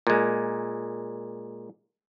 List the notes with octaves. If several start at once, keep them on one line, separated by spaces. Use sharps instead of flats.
A#2 G#3